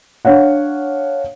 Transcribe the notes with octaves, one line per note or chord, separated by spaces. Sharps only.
D4 C#5 F5 F#5